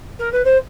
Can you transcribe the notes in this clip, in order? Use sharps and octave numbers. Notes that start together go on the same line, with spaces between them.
A#4
B4
C5